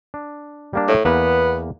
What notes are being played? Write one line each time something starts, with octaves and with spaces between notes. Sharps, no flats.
D4
G3 A#3 D4
A2
E2 A#3 B3 B4